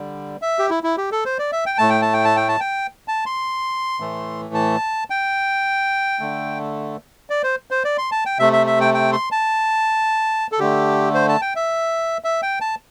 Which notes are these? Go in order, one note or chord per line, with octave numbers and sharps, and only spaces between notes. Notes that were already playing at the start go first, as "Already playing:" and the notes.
Already playing: D3 G3
E5
G4
E4
E4
G4
A4
C5
D5
E5
G5
A2 A3 A5
G5
A5
G5
A5
G5
A5
G5
A5
C6
A2 E3 A3
A5
G5
D3 A3
D5
C5
C5
D5
C6
A5
G5
C3 A3 E5
E5
E5
G5
G5
C6
A5
A4
D3 A3 G4
C5
A5
G5
E5
E5
G5
A5